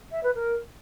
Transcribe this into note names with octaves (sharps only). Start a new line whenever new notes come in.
E5
B4
A#4